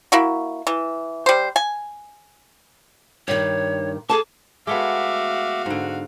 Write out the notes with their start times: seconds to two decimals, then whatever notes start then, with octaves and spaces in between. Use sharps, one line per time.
0.12 A#3 E4 F#4
0.67 E3
1.26 G3 C5
1.56 G#5
3.28 G2 D#3 C#5
4.09 G#4 A4 A5 D6
4.67 G#3 A3 B3 F#4 E5 F5 D6
5.66 G#2 D3